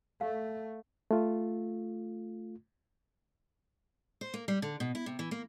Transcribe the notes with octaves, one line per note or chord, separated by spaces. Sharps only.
A3 F5
A3 F4
C5
A#3
G3
D3
B2
E4
C3
E3
A#3